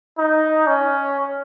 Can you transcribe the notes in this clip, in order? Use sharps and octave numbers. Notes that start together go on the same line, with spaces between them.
D#4
C#4